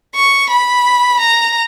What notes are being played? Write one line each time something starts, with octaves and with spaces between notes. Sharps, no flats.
C#6
B5
A#5